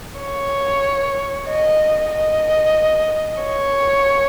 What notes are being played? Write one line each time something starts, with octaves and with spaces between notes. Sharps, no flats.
C#5
D#5
D#5
C#5